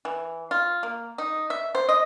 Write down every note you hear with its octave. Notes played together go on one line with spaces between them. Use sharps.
E3
F4
A#3
D#4
E5
C5
D#5